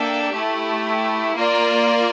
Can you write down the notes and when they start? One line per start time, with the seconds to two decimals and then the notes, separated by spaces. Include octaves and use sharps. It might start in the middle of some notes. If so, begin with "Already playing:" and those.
Already playing: A#3 D4 A4 E5 G5
0.34 A3 E4 G4
1.37 A#3 F4 A#4 D5